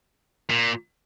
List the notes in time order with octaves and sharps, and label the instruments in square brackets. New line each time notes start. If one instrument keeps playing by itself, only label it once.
[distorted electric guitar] A#2